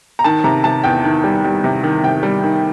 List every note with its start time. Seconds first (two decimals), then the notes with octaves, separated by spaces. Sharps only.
0.19 A#5
0.24 D#3 A5
0.44 C3 A#5
0.64 C3 A5
0.84 E2 G5
1.04 D#3
1.24 G3
1.44 G3
1.64 C3
1.84 D#3
2.03 C3 G5
2.23 G3
2.44 D#3